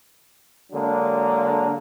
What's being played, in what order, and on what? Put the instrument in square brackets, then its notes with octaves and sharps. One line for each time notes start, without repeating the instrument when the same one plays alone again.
[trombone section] D3 F#3 G#3 A#3 D4